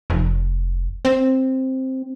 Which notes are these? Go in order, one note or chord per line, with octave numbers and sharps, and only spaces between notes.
F1
C4